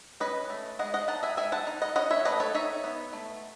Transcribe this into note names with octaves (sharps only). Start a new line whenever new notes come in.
C#4 B4 D#5
A3
G#3 D#5 F#5
D#5 F#5
D#4 F#5 A5
E5 G#5
G#3 E5 G#5
F#5 A5
D#4
D#5 F#5
C#4 D#5 F#5
C#5 E5
A3 B4 D#5
A4 C#5
D#4 C#5 E5
B3
A3